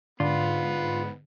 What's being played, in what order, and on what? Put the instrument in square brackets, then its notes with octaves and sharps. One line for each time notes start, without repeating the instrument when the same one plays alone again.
[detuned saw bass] G#2 [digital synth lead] D3 [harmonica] B3 [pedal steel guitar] F4